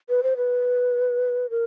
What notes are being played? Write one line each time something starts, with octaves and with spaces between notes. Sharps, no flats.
B4
C5
B4
A#4